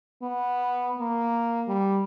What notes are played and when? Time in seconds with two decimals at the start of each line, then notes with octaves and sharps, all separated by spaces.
0.22 B3
0.99 A#3
1.68 G3